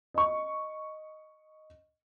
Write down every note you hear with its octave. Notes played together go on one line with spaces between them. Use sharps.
D#5 C#6